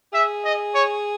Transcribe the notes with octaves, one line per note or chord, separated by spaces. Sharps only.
G#4 E5
D#5
C#5